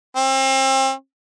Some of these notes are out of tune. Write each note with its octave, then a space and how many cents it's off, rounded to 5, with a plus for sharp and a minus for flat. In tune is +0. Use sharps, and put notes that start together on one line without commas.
C4 +35